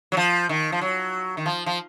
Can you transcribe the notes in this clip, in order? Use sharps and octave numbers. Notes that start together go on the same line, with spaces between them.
F#3
F3
D#3
F3
F#3
D#3
F3
F3